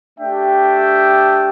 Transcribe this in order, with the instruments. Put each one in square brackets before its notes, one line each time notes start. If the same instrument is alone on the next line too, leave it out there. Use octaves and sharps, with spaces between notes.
[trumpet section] A3 D4 G4 E5 G5